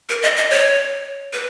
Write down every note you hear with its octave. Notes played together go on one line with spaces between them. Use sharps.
A#4
D#5
D#5
C#5
B4